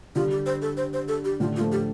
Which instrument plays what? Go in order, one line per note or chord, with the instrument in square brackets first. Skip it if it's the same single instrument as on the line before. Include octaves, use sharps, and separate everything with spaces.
[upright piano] D3 G3 [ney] F4
[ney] G4
C5
A4
C5
C5
A4
G4
[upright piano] A2 D3 [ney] F4
[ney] F4
[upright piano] F3 A3
[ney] G4